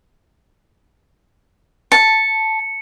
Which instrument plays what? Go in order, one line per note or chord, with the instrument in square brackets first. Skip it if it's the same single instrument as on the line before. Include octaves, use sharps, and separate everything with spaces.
[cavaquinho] A5 [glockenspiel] C#7